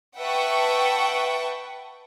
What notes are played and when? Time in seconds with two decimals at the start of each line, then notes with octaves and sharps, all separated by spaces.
0.18 B4 E5 F#5 G5 A5 C#6